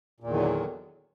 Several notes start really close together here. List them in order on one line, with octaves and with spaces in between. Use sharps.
A#2 E2 D#3 D3 F#3